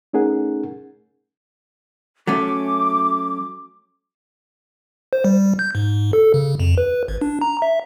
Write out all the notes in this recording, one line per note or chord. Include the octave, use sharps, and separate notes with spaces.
A3 C#4 D#4 G#4 A#4 F#5
F#3 A3 C#4 D6
C5
G3
G6
G#2
A4
C#3
F2
B4
G#1
D4
A#5
E5